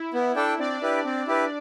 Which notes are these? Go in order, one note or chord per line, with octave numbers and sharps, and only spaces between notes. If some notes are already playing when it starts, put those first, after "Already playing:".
Already playing: E4
B3
D4 A4 D5 G5
C4 D4 D5
E4 G4 B4
C4
E4 G4 B4